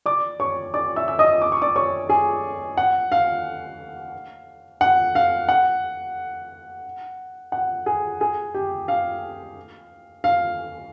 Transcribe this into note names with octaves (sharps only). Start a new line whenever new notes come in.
D5 D6
C#5 C#6
D5 D6
E5 E6
E6
D#5 D#6
D6
C#6
D5 D6
C#5 C#6
G#4 G#5
F#5
F5
F#5
F5
F#5
F#5
G#4 G#5
G#4 G#5
G4 G5
F5
F5